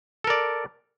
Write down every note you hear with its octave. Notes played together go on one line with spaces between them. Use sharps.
A4 A#4 D5